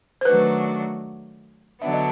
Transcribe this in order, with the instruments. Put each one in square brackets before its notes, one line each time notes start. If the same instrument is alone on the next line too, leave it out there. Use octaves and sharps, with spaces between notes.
[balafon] C5
[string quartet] D#3 F#3 A3 D4 F#4 [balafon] B4
[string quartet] D3 F#3 B3 D4 [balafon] E5
[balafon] D#5